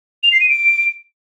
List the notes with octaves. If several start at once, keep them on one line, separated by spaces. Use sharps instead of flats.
F7
C7
D#7
D7